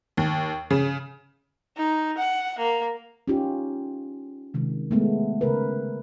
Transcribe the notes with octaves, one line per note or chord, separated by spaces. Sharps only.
D#2
C#3
D#4
F#5
A#3
C#4 D#4 F4 G4
C3 D#3 G#3
G#3 A3 B3
C#3 A#4 B4